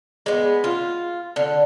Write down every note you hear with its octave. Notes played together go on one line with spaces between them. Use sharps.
G#3 B3
F4
D3